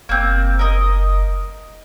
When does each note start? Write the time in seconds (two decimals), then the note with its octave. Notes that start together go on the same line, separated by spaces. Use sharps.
0.09 F#1 A#3 C4
0.59 A#4 D#5